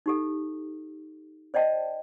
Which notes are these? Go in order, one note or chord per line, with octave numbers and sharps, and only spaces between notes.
D#4 G4 A4
C5 D5 D#5 G5 A5